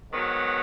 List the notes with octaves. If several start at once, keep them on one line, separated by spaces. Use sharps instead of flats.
G#2 D#3 F#3 B3